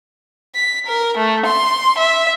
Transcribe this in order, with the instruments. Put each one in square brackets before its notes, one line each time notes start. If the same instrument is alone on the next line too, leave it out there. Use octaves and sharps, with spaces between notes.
[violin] B6
A#4
A3
C6
E5